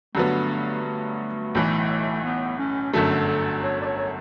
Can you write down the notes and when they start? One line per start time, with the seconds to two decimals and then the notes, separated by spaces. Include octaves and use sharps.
0.15 G2 D3 F#3 A3 B3
0.85 A3
1.55 B1 A2 E3
2.24 B3
2.58 C#4
2.93 G1 F#2 D3 F#3 A3 A4
3.27 A4
3.63 C#5
3.81 D5
3.85 C#5
3.98 C#5